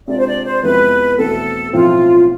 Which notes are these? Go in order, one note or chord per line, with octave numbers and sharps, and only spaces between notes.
C3 G#3 D4 F4 D5
C5
D5
C5
F2 C3 G#3 B3 E4 B4
E2 B2 A3 C4 A4
B1 A2 F3 A3 C4 F4